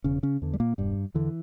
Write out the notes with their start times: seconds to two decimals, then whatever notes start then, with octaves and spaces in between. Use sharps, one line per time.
0.04 E1 C#3 C#4
0.23 C#3 C#4
0.42 E2 D3
0.54 G3
0.60 A#2 A#3
0.78 E1 G2 G3
1.14 E2 D3 E3